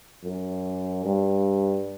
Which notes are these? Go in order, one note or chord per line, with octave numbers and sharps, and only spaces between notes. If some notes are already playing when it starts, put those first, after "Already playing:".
F#2
G2